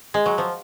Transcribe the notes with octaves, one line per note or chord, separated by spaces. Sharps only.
G#3
F#3
F3